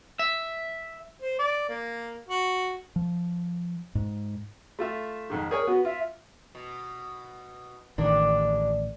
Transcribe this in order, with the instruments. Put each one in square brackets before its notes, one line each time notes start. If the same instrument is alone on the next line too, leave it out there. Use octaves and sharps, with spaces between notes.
[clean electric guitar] E5
[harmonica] C5
D5
A#3
F#4
[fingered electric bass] F3
G#2
[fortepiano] A3 F4 E5
F2 G#2 D#3
[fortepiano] G#4 C#5 G#5 [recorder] A#4
[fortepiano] B3 [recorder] F#4
[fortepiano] F4 [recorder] E5
[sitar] B2
[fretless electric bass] A1 D#3 [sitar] G3 G#3 D4 [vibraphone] D5